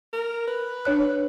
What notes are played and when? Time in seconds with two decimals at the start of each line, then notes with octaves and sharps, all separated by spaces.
0.13 A#4
0.47 B4
0.85 D4 C#5 F#6